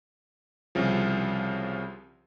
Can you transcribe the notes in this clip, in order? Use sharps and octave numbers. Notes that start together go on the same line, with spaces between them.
C2 C#3 F3